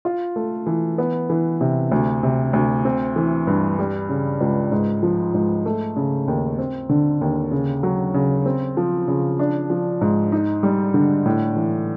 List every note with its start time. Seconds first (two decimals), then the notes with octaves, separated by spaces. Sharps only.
0.05 F4
0.36 A3
0.67 E3
0.98 B3
1.30 E3
1.61 C3
1.91 D2
2.23 C3
2.53 D2
2.85 C4
3.16 E3
3.47 G2
3.79 G3
4.09 C#3
4.41 C#2
4.72 G#2
5.03 F3
5.34 G#2
5.66 A3
5.96 C#3
6.28 D#2
6.58 C4
6.89 D3
7.21 D#2
7.51 C#3
7.83 F#3
8.14 C#3
8.46 C4
8.77 F3
9.08 C#3
9.39 D4
9.70 F3
10.01 G#2
10.32 D#4
10.63 G3
10.94 D3
11.26 A2
11.57 E3